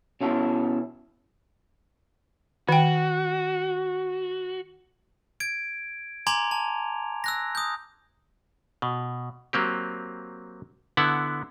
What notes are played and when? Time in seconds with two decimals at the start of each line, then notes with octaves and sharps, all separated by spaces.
0.21 B2 C#4 E4 A4
2.69 D#3 F#4 G5
5.40 G#6 D7
6.27 G#5 A#5 C6 D6 G#6 F7
6.51 A5
7.24 E6 F#6 A#6
7.55 D#6 G6
8.82 B2
9.53 F#3 A#3 C4 G4
10.97 D3 B3 E4 F#5